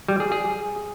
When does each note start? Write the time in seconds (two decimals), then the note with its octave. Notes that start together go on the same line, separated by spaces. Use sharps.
0.08 G3
0.20 G#4
0.32 G#4